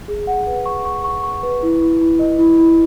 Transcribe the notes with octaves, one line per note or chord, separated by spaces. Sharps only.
G#4
F#5
B4
C#6
C#6
C#6
C#6
B4
E4
E4
E4
D#5
E4
E4